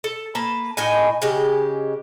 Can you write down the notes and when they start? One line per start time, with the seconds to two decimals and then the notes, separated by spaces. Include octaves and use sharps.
0.04 A4
0.35 A#3 B4 A5
0.77 A2 D#4 D#5 G#5
1.22 C#3 G#3 G4